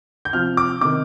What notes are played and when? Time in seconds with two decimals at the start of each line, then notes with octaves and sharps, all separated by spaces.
0.25 G6
0.33 C3 F3 F6
0.57 D6
0.81 C3 D#3 D6